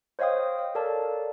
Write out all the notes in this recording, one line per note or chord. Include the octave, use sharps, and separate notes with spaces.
C5 C#5 D#5 F5 G5 D#6
F5
A4 A#4 C#5 D5 F5 A5